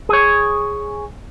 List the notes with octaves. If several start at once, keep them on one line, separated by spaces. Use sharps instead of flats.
G#4 C#5